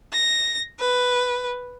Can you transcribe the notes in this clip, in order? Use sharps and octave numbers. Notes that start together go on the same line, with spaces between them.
A#6
B4